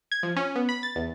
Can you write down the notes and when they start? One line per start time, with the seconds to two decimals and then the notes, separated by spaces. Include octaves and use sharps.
0.12 G#6
0.23 F3
0.36 C#4
0.56 B3
0.69 B5
0.83 A6
0.96 E2